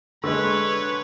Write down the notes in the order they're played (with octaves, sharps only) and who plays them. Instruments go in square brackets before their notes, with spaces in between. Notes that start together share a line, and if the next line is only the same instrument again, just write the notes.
[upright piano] D3 G#3 [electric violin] B4 C#5